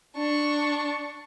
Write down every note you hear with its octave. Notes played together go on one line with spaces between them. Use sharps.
D4 C#6